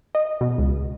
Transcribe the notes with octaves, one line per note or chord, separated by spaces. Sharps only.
D#5
B2
C#2